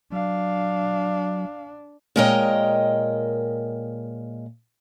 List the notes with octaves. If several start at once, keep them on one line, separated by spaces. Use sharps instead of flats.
F#3 D4 F5
A#2 G#3 A#4 C#5 D#5 G5